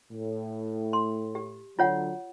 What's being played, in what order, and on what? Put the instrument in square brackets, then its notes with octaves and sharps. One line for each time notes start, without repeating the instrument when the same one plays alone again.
[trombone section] A2
[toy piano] C6
G4
[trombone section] D3 F#3 [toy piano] F4 C#5 F#5